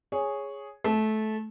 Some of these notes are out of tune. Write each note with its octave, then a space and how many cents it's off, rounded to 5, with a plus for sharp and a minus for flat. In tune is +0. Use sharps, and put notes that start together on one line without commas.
G#4 +0 C#5 +0
A3 -20 A5 -20